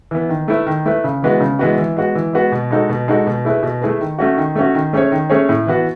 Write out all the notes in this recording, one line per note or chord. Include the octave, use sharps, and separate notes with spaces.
E3 B3
D#3
A3 E4 B4
D#3
A3 E4 B4
C#3
E3 G#3 B3 F#4
C#3
E3 G#3 B3 F#4
E3
G#3 B3 F#4
E3
G#3 B3 F#4
B2
G#3 D#4 F#4 A4
B2
G#3 D#4 F#4 A4
B2
A3 E4 G#4 B4
B2
A3 E4 G#4 B4
D#3
A3 C#4 F#4
D#3
A3 C#4 F#4
D#3
A3 C#4 G#4 C#5
D#3
A3 C#4 G#4 C#5
A2
E3 B3 F#4